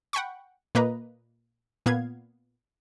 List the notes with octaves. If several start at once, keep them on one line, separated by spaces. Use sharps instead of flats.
F#5 G5 B5 C#6
A#2 A#3 B4 D#5 A#5
A#2 B3 F5 G#6